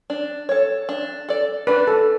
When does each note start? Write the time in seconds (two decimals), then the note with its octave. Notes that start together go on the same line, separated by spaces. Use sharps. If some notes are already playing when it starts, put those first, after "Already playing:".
0.10 D4
0.49 A4 C#5
0.89 D4
1.29 A4 D5
1.67 D4 B4
1.87 A4